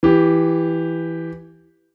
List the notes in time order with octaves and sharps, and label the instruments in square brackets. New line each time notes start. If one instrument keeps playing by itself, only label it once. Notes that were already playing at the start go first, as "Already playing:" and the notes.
[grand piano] E3 G4